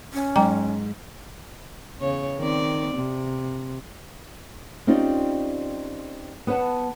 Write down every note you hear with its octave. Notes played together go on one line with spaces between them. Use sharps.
C#4
G#2 F#3 G5 A#5
E2 C#3 C#5
D#3 C4 D5
C3
C4 C#4 D#4 F4 G4 D5
B3 B4 C5 F#5 A5